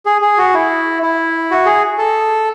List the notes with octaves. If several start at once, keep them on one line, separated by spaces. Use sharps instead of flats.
G#4
G#4
F#4
E4
E4
F#4
G#4
A4